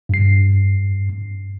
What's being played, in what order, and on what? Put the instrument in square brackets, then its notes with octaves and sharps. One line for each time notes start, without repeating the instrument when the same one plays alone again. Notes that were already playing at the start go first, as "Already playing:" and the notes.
[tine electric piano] G2 C7